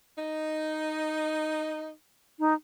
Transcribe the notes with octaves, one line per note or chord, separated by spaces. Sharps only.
D#4
D#4